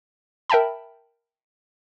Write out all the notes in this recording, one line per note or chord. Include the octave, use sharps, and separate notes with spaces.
A#4 E5 G5 A5 B5